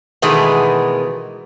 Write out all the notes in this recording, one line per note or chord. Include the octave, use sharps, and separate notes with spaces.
B2 D#3 E3 G#3 A3 B3